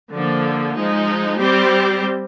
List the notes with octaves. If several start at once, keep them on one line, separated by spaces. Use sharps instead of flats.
D3 F3 A#3
F3 G#3 D#4
G3 C4 G4 C5